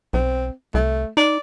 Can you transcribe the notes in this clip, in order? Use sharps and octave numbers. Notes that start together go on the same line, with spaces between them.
B1 C4
C2 A3
D#4 D5